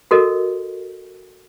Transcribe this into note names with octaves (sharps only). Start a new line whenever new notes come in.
F#4 A4 A#4 D#5